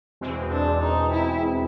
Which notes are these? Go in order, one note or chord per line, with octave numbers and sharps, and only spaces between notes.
E2 B2 G#3 C4
D4
D#4
E4